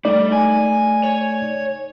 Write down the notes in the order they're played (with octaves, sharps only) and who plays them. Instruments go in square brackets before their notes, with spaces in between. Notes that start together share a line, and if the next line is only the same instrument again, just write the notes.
[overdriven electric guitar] G3 [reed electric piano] A3 D#4 D5
[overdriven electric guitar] G#5
C#5